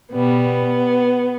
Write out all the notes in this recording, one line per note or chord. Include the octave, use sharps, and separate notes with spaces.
B2 G3 B3